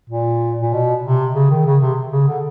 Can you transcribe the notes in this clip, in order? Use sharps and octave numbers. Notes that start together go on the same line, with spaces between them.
A#2
A#2
B2
C3
C#3
D#3
C#3
C3
C#3
D3